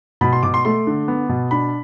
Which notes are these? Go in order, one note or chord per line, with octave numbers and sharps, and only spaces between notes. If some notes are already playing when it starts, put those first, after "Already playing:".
B2 B5
C6
B2 D6
C6
A3 C6
D3
B3
B2
D4 B5